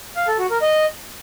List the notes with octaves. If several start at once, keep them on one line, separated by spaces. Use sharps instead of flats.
F5
A4
F#4
A#4
D#5